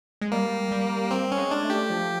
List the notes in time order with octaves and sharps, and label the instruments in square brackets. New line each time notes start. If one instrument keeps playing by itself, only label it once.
[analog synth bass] G#3
[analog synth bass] G3 [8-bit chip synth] A#3
[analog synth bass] G3
[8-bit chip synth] C4
C#4
[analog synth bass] G#3
[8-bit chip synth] D4
[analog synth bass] A3
[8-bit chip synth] G4
[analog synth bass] F3